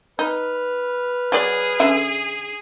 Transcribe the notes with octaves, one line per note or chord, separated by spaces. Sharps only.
D#4 B4 F6
F#3 G#4 D5
D3 C#4 E5